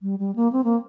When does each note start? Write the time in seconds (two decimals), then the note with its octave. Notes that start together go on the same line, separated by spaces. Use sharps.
0.02 G3
0.19 G3
0.36 A#3
0.52 C4
0.64 A#3